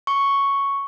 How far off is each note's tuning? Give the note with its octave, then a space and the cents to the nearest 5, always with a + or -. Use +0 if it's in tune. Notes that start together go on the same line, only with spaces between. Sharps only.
C#6 +0